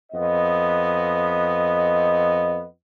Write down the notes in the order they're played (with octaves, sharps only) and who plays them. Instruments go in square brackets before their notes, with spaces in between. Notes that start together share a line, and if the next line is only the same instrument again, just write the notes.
[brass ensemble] F2 B3 D#5